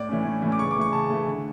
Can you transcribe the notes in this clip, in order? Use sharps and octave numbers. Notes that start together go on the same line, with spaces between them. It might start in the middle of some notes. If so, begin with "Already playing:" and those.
Already playing: A2 D5
E3 A3 C#4
A2
E3 A3 C#4
D6
C#3 C#6
D6
E3 A3 C#6
C#3 A5
E3 A3
D3